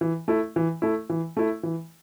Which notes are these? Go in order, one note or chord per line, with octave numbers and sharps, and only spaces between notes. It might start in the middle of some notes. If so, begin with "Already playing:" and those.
E3
A3 E4
E3
A3 E4
E3
A3 E4
E3